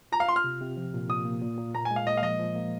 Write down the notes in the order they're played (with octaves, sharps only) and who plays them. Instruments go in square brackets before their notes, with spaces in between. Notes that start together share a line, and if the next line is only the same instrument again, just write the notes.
[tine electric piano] F4 [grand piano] A#5
[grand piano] F5
[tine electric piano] F4 [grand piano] C6
[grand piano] F6
[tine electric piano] C3
C3
F3
A#2
[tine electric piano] A#2 [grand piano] D#6
[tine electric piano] A#3
A#2
A#2
[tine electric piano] A#2 [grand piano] A#5
[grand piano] G#5
[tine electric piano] G#3
[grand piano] F5
[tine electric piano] A#3 [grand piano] D#5
[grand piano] F5
[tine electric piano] F3 [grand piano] D#5
[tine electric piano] F3
A#3